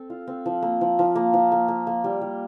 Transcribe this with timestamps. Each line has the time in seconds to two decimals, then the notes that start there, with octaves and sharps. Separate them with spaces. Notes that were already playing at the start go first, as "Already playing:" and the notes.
Already playing: C4 A4
0.10 F4
0.27 C4
0.46 F3
0.62 A#3
0.81 F3
0.99 F3
1.15 A#3
1.33 F3
1.52 A#3
1.68 A#3
1.87 A#3
2.04 G3
2.21 G3